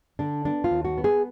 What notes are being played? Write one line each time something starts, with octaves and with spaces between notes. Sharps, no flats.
D3 D4
B3 D4
F4
D#2
F#4
B3
G#4